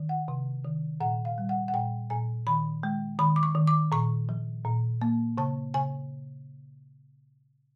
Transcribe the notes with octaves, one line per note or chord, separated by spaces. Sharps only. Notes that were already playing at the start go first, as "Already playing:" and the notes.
Already playing: D#3
F#5
C3
D#3
A#2 F#5
F5
G3
F#5
F#5
A#2 G5
A#2 G#5
D#3 B5
G#3
D#3 B5
D6
C#6
D#3
D6
A#2 C#6
F3
A#2
A#3
C#3 A5
C#3 G#5